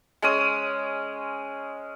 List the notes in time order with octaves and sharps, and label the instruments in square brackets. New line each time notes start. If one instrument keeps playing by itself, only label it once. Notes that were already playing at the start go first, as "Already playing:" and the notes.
[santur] G#3 C#4 D#6